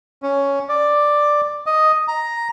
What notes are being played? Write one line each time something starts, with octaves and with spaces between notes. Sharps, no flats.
C#4
D5
D#5
A#5